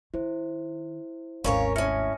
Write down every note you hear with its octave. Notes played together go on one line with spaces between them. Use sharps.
D#3 E4 C5
G#1 D#2 C#4 A#4 C#5 F5
A2 C#4 E5 F6 A#6 C#7